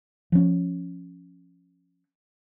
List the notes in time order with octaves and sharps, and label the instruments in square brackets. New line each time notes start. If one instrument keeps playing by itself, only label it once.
[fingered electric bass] F3 C#4